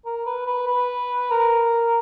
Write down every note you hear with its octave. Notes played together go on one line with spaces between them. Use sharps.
A#4
B4
B4
B4
A#4